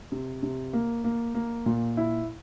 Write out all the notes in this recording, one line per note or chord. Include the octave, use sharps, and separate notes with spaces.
C3
C3
A#3
A#3
A#3
A#2
E4